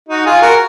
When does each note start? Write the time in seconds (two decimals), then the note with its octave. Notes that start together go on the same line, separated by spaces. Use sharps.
0.09 D#4 F#4
0.26 F4 G#4
0.42 F#4 A#4